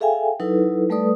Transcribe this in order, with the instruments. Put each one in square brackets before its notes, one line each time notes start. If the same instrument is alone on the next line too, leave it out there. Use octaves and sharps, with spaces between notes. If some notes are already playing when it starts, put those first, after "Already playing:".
[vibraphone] G#4 A4 E5 F5 G5 G#5
F#3 D#4 E4 A4 B4
G3 A3 A4 B4 D5 D#6